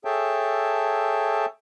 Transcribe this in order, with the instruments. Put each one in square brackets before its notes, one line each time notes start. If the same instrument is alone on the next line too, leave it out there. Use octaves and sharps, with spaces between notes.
[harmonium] G#4 A4 C#5 E5 G5 A5